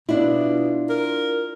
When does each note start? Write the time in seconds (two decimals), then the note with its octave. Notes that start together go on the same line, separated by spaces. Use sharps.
0.09 B2 D4 E4 F4
0.90 A#4